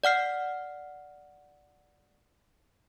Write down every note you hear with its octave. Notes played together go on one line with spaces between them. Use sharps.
D5 F#5 F6 C7